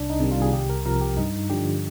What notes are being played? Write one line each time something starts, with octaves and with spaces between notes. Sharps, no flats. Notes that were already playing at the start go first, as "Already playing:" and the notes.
Already playing: C2 D4
D#4
C3 D#3 G3
F4
G#4
C2 G4
A#4
C3 F3 A#4
G4
G2 D#4
D3 F3 G4